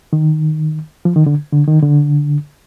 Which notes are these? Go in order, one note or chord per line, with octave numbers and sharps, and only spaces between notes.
D#3
F3
D#3
D3
D3
D#3
D3